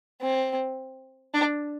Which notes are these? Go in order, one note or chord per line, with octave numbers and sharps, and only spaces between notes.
C4
D4